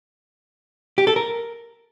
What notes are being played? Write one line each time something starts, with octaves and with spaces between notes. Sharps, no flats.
G4
A4
A#4